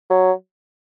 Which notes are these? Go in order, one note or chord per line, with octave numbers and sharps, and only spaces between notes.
F#3